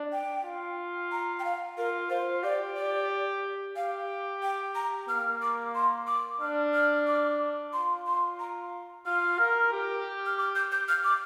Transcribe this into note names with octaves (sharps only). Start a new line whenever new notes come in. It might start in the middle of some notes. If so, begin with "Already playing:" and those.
Already playing: D4
G5
F4
A#5
G5
F5
F4 A#4
F4 C5
G4 D5
D5
G4 F5
G5
A#5
A#3 F6
D6
C6
D6
D4 F6
F6
D6
F4 C6
C6
A#5
F4 F6
A#4
G4
F6
D6
G6
G6
F6
D6